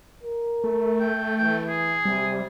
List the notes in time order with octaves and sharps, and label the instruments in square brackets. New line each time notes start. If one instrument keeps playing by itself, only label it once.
[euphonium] A#4
[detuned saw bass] A3
[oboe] G5
[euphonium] E3 [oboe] G5
[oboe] G#4
[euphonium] C3 [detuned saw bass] G3